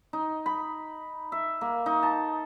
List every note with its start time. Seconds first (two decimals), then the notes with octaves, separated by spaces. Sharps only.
0.13 D#4
0.46 B5
1.32 E5
1.61 A#3
1.86 D#4
2.03 A5